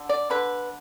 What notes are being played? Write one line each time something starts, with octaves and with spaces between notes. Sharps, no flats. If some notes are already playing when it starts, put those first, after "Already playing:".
Already playing: D3
D5
D3 B4